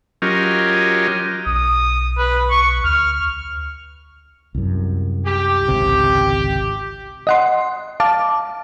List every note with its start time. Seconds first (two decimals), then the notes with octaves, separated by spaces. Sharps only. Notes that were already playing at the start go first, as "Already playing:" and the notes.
0.22 F#3 C#4 F4 G4 A#4 D#5
1.46 B1 D#6
2.18 B4
2.50 C#6
2.84 D2 F6
4.55 C2 F#2
5.27 G4
5.68 G#1 C#2 C3
7.27 D#5 F#5 C6
8.00 F5 A5 D6